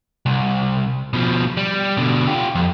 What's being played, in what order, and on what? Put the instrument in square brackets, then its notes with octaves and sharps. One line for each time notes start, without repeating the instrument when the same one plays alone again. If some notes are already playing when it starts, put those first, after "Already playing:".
[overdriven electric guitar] C2
B2 F3
G3
B2 D3
F4 G4
F2